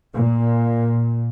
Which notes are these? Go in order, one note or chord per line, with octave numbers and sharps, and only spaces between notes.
A#2